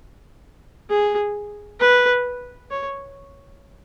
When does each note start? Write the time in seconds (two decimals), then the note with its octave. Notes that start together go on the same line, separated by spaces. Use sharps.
0.90 G#4
1.80 B4
2.71 C#5